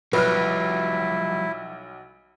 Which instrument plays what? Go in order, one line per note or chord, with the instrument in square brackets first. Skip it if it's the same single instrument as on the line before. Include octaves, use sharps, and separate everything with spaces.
[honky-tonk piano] B1 F6 [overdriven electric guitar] F3 G3 [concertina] E4 [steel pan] B4